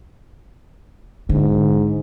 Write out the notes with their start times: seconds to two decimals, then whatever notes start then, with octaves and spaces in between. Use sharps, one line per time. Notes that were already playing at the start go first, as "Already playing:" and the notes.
1.29 G#2 D3